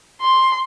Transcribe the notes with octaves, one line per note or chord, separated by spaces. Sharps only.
C6